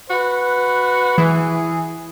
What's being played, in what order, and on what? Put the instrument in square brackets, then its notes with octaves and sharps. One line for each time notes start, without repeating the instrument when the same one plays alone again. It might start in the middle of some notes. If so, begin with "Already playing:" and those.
[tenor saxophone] F#4 [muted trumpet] B4
[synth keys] E3 [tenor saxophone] G#4